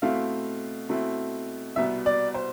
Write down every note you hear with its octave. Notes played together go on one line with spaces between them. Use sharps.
B2 A3 C4 E4 F5
B2 A3 C4 E4
C2 B2 B3 E5
D5
C5